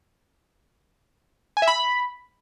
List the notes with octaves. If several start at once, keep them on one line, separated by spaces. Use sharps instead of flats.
G#5
E5
B5